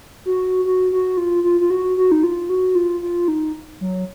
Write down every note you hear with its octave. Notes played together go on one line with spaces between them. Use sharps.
F#4
F#4
F#4
F4
F4
F4
F#4
F#4
D#4
F4
F#4
F4
F4
D#4
F#3